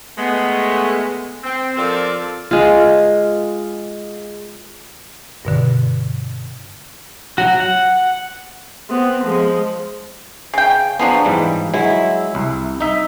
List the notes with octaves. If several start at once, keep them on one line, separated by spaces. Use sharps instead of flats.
G#3 A3 B3
C4
F3 C4 F4 A4 A#4 D5
G#3 F4
G2 B2 D3
F#3 F#4
F#5
B3 C4
F3 G#3
C#3 G5
C#3 F3 F#3 B3 D4
G#2 E3 G3
F#3 G#3 E4
C2
D#4 E5